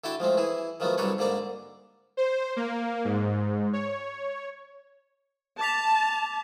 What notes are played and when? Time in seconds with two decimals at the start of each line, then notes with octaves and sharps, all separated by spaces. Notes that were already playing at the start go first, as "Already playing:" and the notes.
0.04 D3 E4 F#4 G5 A5
0.20 F3 G#3 A3 C4
0.37 E3 E4 G#4
0.80 D#3 F3 F#3 A3 B3
0.98 C2 F#3 D4 A4 B4 C#5
1.18 G#2 D3 A#3 A#4 D5
2.17 C5
2.56 A#3
3.05 G#2
3.73 C#5
5.61 A5 D6 B6 F7